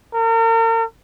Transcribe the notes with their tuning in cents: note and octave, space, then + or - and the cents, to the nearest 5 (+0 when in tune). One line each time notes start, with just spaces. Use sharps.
A#4 -40